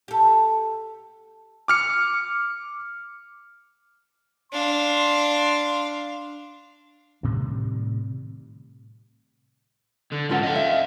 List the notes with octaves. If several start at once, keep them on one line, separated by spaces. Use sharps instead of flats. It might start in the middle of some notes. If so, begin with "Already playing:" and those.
G4 A4
D6 F6 C#7
D4 F5 C6
A2 C3 D#3 G3
D3
G#2 C#4 F4 A4 F#5
D#5 F5
E5